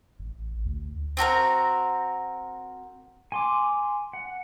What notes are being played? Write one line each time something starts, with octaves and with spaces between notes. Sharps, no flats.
A1
D2
C4 F#4 A4 A#4
G#5 C6 D6
F#5